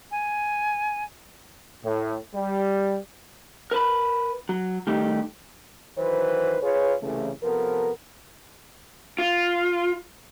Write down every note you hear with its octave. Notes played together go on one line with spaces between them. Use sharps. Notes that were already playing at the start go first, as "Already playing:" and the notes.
G#5
A2
G3
A#4 B4 A5 B5
F#3
D#3 G3 A3 D#4 G4
D#3 E3 F#3 B4 C5
F4 G#4 B4 C#5
C2 C#3 E3 A3
C3 F3 B3 A4 A#4
F4